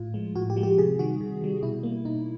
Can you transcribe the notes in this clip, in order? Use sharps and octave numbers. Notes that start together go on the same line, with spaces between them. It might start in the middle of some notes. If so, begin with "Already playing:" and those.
Already playing: A2 F4
F3 G#3
A2 F#4
G4
F3 G#3
G4
C3 G#4
D#3 G3 F#4
C3
D#3 G3
B2 E4
G3 A#3
B2 D#4